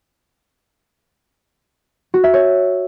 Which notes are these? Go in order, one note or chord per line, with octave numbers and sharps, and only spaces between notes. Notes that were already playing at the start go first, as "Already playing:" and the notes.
F#4
E5
C#5